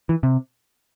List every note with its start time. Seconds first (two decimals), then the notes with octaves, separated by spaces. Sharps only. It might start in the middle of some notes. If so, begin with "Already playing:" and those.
0.09 E3
0.23 C3